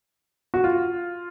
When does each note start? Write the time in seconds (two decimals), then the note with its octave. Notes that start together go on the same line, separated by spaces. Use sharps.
0.54 F#4
0.64 F4